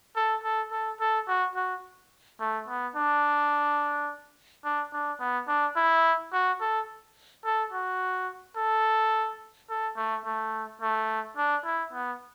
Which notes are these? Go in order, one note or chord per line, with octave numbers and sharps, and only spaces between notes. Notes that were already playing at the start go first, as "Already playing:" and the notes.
A4
A4
A4
A4
F#4
F#4
A3
B3
D4
D4
D4
B3
D4
E4
F#4
A4
A4
F#4
A4
A4
A3
A3
A3
D4
E4
B3